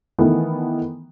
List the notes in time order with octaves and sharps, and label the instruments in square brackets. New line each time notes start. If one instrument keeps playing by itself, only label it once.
[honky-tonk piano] D#3 E3 A3 B3